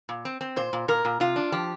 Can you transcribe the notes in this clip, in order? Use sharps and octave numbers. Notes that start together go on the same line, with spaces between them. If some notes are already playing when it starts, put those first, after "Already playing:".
A#2
C4
C4
A#2 C5
A#2
A#2 A#4
A#2
C3 F4
D4
F3 G4